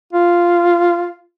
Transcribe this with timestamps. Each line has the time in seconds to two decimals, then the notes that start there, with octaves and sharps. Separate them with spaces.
0.13 F4